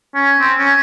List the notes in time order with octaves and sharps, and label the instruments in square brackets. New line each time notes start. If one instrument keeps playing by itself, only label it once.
[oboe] C#4
C4
C#4